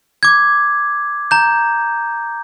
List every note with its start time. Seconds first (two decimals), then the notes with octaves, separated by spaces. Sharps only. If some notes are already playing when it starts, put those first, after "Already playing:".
0.23 D6 G#6
1.31 A#5 G6